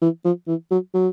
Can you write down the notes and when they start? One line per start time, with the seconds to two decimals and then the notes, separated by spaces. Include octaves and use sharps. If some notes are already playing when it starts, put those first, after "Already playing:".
0.01 E3
0.24 F3
0.47 E3
0.71 F#3
0.94 F#3